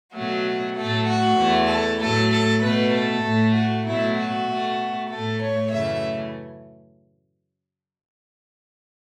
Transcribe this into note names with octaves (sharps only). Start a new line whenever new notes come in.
B2 F#3 A3 F#4
A2 F#3 A3 A4
F#4
E2 E3 A3
A4
A2 F#3 A3 A4
A4
B2 A3 B4
A4
A2 A3
F#4
B2 F#3 A3 E4
F#4
B2 A3
A2 A3 A4
C#5
F#2 C#3 E3 A3 E5